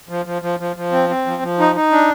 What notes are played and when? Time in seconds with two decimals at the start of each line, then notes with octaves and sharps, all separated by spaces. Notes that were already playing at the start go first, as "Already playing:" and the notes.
0.09 F3
0.26 F3
0.42 F3
0.60 F3
0.76 F3
0.92 C4
1.09 C4
1.26 F3
1.42 F3
1.59 D#4
1.76 D#4
1.91 D4